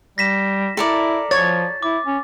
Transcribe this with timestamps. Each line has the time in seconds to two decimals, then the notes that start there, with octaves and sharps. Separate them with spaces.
0.18 G3 A#6 B6 E7
0.77 E4 A4 A#4 D5
1.31 F3 C#5 A6
1.83 E4 D6
2.07 C#4